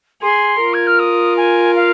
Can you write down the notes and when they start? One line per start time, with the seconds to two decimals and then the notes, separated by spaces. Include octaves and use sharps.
0.22 G#4 C6
0.60 F4 A#4
0.74 G#6
0.87 F6
0.99 D#6
1.37 G#5
1.76 F5